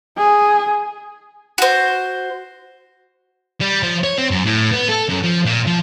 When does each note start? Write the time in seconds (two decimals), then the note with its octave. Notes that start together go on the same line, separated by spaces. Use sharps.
0.18 G#4
1.58 F#4 C5
3.61 G3
3.83 F3
4.04 C#5
4.18 C4
4.31 F#2
4.46 A2
4.72 B3
4.89 A4
5.09 F#2
5.24 F3
5.45 A#2
5.67 F3